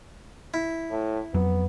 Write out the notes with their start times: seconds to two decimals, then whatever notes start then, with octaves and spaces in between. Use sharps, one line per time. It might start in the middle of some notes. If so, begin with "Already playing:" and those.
0.54 E4
0.91 A2
1.34 F2 F#3 B3